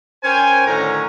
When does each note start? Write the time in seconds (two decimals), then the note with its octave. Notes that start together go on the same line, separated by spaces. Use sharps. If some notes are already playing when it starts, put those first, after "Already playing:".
0.24 C#4 A#4 C5 G5 G#5
0.67 A2 D3 D#3 F#3 C#4 A#5